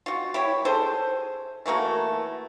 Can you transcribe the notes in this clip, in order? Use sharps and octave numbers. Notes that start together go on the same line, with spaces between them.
F4 F#4
E4 G4 C#5
G#4 A4 C5
E3 A3 A#3 F#4